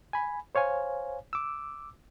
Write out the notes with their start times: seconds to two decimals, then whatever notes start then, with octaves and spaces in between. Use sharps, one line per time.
0.13 G#5 B5
0.55 C5 C#5 F5 G#5
1.33 D6 E6